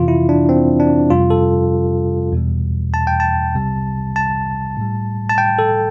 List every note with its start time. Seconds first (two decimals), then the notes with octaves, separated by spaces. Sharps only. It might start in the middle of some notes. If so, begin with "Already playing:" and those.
Already playing: F2 C3 E3 F4
0.08 E4
0.29 D4
0.49 C4
0.80 D4
1.10 F2 C3 G3 F4
1.30 A4
2.32 E2 B2 G3
2.94 A5
3.07 G5
3.20 A5
3.55 C2 C3 G3
4.16 A5
4.77 A2 G3
5.29 A5
5.38 G5
5.59 A4